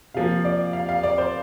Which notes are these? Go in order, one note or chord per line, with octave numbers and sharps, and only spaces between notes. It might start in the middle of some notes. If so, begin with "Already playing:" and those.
C3 F3 A#3 F5
D5
F5
F5
D5
C5